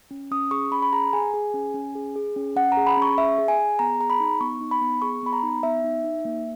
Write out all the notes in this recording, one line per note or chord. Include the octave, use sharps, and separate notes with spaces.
C#4
C#4 D#6
G#4 C#6
C#4 B5
B5
G#4 A#5
G#4 G#5
G#4
C#4
C#4
G#4
G#4
C#4
C#4 F#5
A#5
G#4
B5
C#4 C#6
G#4 E5
G#4
G#5
G#4
B3 A#5
G#4 A#5
B5
D#4
B3 C#6
D#4
B5
B3
G#4 C#6
B3 B5
A#5
D#4
B3 E5
D#4
D#4
A#3